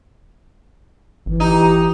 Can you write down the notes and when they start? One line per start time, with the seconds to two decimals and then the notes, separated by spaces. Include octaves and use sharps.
1.26 G#1 E3
1.40 D#4 G4